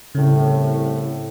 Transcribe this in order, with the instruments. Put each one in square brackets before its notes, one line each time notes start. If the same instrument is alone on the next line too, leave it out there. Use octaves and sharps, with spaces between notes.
[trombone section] C2 A2 [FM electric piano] C#3